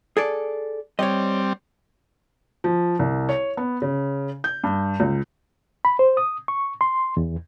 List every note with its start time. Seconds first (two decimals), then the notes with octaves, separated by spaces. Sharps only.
0.17 G#4 A4 D5
0.99 G3 C4 C#5 D#5
2.64 F3
2.99 C2
3.29 C#5
3.57 B3
3.82 C#3
4.44 G6
4.64 G2
5.00 C#2
5.85 B5
5.99 C5
6.17 D#6
6.48 C#6
6.81 C6
7.17 E2